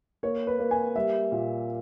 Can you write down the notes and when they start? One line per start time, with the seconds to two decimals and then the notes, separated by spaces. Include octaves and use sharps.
0.23 A#3 C#5
0.47 B4
0.59 A#3
0.71 G#5
0.96 G3 E5
1.32 A#2